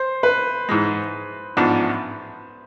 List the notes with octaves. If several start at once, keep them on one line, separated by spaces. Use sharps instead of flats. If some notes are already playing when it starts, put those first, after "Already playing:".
Already playing: C5
B4
G#2 E3 G#3
A1 G#2 F3 B3 D4